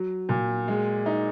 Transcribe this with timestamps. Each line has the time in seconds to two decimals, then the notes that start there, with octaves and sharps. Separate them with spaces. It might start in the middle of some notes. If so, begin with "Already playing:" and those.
Already playing: F#3
0.29 A#2
0.68 G#3
1.06 D#4